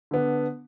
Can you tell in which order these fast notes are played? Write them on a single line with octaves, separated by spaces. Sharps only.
D3 B3 D4